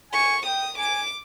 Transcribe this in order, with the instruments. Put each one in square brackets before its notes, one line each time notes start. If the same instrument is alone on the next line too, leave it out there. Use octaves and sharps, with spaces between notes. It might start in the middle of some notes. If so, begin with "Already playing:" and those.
[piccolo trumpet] G#5 [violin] C#6
[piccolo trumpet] G5 [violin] D#6
[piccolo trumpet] G#5 [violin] D6